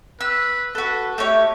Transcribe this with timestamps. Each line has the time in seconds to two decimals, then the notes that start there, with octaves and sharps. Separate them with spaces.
0.21 B4 E6
0.75 F#4 A4 B4
1.18 A3 D#4 G4 C#5